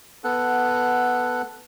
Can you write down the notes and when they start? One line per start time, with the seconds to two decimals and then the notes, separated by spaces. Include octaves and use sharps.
0.24 B3 A4 F#5